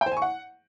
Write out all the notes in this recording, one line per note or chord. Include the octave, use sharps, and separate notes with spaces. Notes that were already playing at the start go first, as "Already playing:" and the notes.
G5
C5
G#5
C#6
F#5